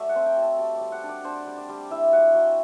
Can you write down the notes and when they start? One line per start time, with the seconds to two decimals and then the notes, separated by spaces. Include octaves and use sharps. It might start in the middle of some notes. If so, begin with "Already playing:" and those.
Already playing: F#3 A3 D5 E5
0.09 F#5
0.15 C4
0.26 G5
0.37 F#3
0.43 A5
0.59 G3 G5
0.76 D6
0.81 G3
0.92 F#5
1.03 D4
1.09 D5
1.25 D4 C5
1.47 G3
1.58 D5
1.69 G3
1.90 E4 E5
2.12 F#3 F#5
2.34 F#3 G5